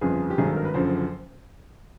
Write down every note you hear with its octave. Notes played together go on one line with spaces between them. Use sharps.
G1 F2 C#3 F3 G#4
G4
G#1 G2 D#3 F#3 G#4
A4
A#4
B4
F#1 F#2 D3 F3 C5